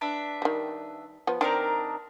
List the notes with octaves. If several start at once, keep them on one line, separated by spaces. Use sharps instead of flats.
D4 B4 E5
D#3 G3
F3 B3
D#3 C4 D4 D#4 A#4